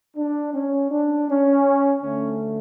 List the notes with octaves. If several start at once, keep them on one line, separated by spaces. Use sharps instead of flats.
D4
C#4
D4
C#4
D2 D3 A3 C#4